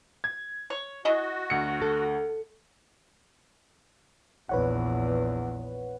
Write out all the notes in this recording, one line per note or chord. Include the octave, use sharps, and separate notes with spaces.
G#6
C#5
E4 F#4 G#4 D#5
D2 C#7
A4
A#1 E2 B4 C#5 F#5